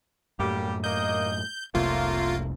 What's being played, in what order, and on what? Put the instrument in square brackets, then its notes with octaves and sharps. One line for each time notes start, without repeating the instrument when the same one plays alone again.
[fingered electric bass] F#2 A2 [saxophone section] G3 A#3 G4
[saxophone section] A#3 D#5 [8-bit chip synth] G6
[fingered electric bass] F1 C2 C3 [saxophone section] F#3 A3 A#3 [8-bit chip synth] F4